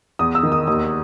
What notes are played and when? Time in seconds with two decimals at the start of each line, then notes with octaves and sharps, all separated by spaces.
0.19 E2 D#6
0.35 E6
0.43 D#3
0.52 D#6
0.67 D#2 D#6